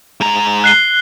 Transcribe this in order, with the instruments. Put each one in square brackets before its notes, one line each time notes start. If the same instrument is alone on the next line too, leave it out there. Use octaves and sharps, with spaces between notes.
[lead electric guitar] G#2 A#5
[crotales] F#6 C7 G7